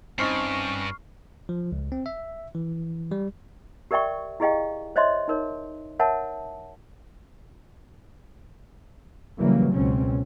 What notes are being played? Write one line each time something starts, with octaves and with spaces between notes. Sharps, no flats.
G2 C4 C#4 D#4 C#6 F6 C7
F3
C#2
C4
E5
E3
G3
G4 A#4 D5 E5 G5 C#6
E4 G4 G#4 D#5 F5 G5
C5 C#5 D#5 E5 C6
D#4 A#4 C#5
A#4 C#5 E5 F#5 A5
C#3 E3 F#3 G3 A#3
C#2 B2 C4 C#4